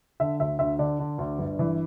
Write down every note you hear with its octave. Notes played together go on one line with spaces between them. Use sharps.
D3 E5
D2 E5
D2 E5
D3 D5
D3
D2
G1
E3